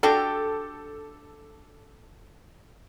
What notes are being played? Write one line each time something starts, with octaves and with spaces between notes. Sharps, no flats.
D4 F#4 G4 A4